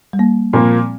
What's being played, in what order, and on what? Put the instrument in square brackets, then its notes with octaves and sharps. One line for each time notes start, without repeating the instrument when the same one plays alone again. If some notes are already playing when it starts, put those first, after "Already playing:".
[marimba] G3
A#3
[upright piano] A#2 F3 A#3 [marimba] C4